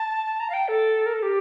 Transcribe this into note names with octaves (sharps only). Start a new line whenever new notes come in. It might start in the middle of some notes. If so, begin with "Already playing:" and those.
Already playing: A5
A#5
F5
G5
A4
A#4
A4
G4